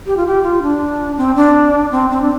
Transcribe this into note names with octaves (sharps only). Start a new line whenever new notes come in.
G4
F4
G4
F4
D4
C4
D4
C4
C4
D4